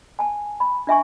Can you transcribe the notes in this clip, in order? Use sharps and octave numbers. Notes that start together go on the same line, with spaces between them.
G#5 A5
B5
D4 E5 G#5 C#6